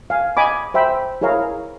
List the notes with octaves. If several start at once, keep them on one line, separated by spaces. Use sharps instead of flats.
F5 G#5
D#5 G#5 B5 D6
C5 E5 G5 B5
E4 G#4 A#4 C#5 F5 A#5